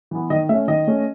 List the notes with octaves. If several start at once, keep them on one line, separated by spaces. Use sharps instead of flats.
E3 B3
D#3 D#5
A3 C#4 E5
D#3 D#5
A3 C#4